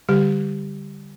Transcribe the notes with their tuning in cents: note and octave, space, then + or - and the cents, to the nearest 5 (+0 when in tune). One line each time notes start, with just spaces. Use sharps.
D3 +0 G3 +15 G4 +0